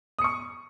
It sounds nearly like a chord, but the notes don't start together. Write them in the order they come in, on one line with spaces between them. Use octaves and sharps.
D#6 C#7 C#6